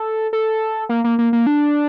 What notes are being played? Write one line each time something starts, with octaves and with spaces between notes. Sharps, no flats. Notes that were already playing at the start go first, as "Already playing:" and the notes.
Already playing: A4
A4
A#3
A#3
A#3
A#3
D4